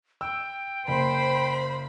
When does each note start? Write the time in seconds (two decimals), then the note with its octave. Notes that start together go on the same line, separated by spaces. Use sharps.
0.21 G5 E6
0.88 F#1 C5 B5